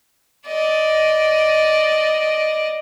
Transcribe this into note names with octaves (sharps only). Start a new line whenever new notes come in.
D5 D#5